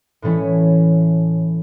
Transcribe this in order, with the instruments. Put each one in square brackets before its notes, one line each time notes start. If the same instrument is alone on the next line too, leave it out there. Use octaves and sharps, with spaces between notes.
[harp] A2 E3 A3 C#4 E4